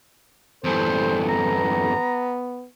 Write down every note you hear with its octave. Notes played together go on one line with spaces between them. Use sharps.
E2 G2 E3 E4 A4 C5
B3 A#5